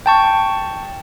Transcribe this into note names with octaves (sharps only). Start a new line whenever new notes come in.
G5 A5 C#6